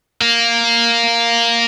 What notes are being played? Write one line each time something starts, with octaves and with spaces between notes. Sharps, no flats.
A#3